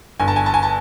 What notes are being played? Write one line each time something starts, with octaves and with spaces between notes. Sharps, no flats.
G1 G#5
A5
G#5
A5
G#5
A5